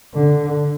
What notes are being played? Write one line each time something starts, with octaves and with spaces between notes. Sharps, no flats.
D3